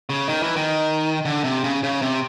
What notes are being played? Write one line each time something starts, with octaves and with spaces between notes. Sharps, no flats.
C#3
D#3
E3
D#3
D3
C3
C#3
C#3
C3